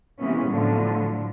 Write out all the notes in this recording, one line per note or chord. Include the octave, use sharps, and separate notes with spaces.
C3 E3 G#3 A#3 B3 C#4
A2 D3 F3 F#3